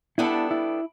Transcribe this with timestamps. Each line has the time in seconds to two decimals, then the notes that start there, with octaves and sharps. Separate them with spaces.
0.18 G3 B3 D4 E4 A4
0.51 E4